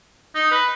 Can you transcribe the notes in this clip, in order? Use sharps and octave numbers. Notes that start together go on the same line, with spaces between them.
D#4
B4